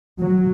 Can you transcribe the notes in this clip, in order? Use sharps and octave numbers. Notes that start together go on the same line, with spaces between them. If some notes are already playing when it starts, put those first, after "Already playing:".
F#3